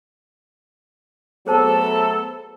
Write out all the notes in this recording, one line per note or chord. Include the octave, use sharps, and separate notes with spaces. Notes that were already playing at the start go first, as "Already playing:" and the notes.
F#3 A3 B3 G#4 A4 C5 A5